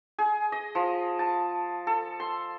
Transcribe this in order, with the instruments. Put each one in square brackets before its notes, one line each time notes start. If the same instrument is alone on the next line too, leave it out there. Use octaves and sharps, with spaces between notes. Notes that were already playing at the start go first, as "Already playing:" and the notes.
[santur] G#4
D#5
F3
A5
A4
C6